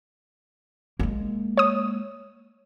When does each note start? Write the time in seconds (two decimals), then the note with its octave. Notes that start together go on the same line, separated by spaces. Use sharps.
1.00 G#3 A#3
1.57 C#5 D#6